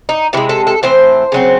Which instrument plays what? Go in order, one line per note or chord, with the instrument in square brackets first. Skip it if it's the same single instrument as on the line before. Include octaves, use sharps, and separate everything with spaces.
[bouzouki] D#4
C3 E3 E4
G#3
A4
A4
A2 E3 C4 C5
C#3 F#3 C4